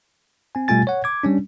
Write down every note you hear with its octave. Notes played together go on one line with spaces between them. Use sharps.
C4 G#5
B2 G3 A3 F4 G#5 A6
C#5 F#5
D6 G#6
G3 C#4 D4